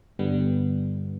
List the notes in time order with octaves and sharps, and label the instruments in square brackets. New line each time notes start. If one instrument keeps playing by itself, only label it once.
[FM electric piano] G2 D3 G3 B3